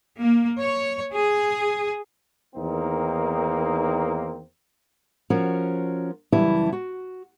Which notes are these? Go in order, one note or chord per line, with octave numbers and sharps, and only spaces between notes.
A#3
C#5
G#4
E2 D#3 A#3 C4 D#4
F3 C#4 F#4 A#4
F#2 C#3 E3 G3 E4 A5
F#4